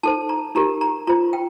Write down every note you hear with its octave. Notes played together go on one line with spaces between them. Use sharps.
D#4 A4 C5 A5
A#5
D#4 G4 A#4 A#5
A#5
F4 C5 A#5
G5